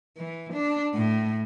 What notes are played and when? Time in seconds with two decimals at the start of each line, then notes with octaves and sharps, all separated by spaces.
0.18 E3
0.53 D4
0.94 A2